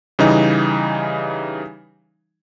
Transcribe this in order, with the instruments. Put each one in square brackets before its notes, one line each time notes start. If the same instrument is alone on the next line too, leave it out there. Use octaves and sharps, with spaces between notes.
[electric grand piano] C#3 E3 G3 D#4